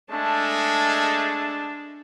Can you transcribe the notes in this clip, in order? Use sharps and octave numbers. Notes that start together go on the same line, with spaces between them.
G#3 A3 D4 A5